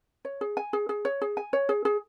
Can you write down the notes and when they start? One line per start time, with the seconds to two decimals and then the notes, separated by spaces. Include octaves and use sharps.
0.25 C#5
0.41 G#4
0.57 G#5
0.73 G#4
0.89 G#4
1.05 C#5
1.22 G#4
1.37 G#5
1.53 C#5
1.69 G#4
1.85 G#4